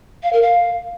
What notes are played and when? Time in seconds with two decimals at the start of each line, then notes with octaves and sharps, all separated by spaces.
0.23 F5
0.33 A#4
0.42 F5